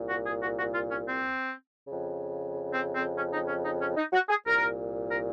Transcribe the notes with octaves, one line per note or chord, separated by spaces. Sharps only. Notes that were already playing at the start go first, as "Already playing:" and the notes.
Already playing: C2 A#2
F#4
G#4
F#4
F#4
F4
C#4
C4
C#3
F2
C4
C4
C#4
D#4
C#4
D#4
C#4
D#4
F#4
G#4
C2 A#2 A#4
A#4